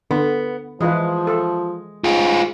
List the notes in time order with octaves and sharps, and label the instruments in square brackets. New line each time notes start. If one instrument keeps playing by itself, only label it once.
[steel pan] D3 [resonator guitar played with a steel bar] B3
[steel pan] E3 F4 B4 [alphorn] F3 [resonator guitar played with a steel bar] G#3
[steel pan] A4
[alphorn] G#2 [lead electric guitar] F4 G#4